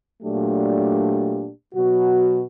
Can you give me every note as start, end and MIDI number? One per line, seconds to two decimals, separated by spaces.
0.23 1.49 46
0.23 1.49 54
0.23 1.49 57
0.23 1.49 62
0.23 1.49 67
1.74 2.41 47
1.74 2.41 54
1.74 2.41 66